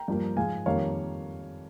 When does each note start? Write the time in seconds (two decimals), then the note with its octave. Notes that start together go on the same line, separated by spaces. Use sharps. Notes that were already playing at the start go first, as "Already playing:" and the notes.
Already playing: G5 A#5
0.08 G2 F3 A#3
0.36 G#2 F3 G#3 F5 G#5
0.66 F2 D#3 G3 A#3 C#5 F5